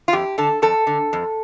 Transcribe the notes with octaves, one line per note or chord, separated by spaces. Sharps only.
F4
F2 G4
D3 A4
F2 A4
D3
F2